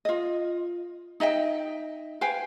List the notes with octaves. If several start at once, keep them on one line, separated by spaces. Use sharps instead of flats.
F4 D#5
D#4 D#5 E5 G5
B4 F5 G5 G#5